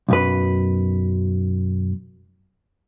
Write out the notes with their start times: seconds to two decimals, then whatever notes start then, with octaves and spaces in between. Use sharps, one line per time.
0.08 B1 F#2 B4